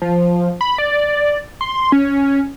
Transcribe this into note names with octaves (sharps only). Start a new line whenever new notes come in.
F3
B5
D5
C6
C#4